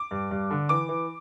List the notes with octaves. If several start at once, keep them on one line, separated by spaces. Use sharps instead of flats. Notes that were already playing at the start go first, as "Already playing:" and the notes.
Already playing: D6
G2
G2
D3
E3 D6
E3